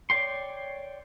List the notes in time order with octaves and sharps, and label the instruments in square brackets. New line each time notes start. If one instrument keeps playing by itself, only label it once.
[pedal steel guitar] C#5 D5 G5 C6